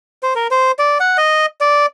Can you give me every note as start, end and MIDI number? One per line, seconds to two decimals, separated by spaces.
0.23 0.34 72
0.35 0.47 70
0.51 0.72 72
0.79 0.98 74
1.00 1.17 78
1.18 1.46 75
1.61 1.86 74